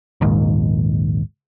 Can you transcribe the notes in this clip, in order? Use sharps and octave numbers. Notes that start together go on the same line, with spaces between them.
A#1 D#2 G#2